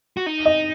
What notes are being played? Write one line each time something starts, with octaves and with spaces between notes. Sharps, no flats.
F#4
D#4
D#5